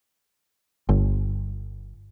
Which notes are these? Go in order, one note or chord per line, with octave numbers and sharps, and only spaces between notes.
G1